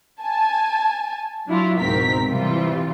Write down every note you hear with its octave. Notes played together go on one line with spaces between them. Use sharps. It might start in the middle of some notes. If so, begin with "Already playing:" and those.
G#5 A5
F#3 D4 E4 F4
C#2 G#2 B2 C4 A#4 B6
C3 E3 G3 F4